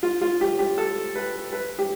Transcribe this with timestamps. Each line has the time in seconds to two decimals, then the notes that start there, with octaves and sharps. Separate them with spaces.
0.03 F4
0.21 F4
0.41 G4
0.59 G4
0.78 A4
1.16 B4
1.53 B4
1.79 G4